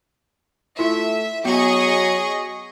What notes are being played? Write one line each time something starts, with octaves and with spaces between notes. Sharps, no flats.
A3 E4 F4 E5
F#3 B3 G#4 D#5 C#6